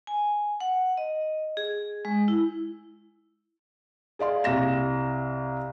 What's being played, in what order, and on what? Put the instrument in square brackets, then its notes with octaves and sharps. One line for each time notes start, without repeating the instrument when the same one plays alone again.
[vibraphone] G#5
F#5
D#5
G#4
G#3
E4
[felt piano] G#4 D5 F5 C6
C2 F5 A#6 E7